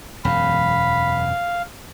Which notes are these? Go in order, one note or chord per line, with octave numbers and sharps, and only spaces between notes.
E1 F#2 F5 B5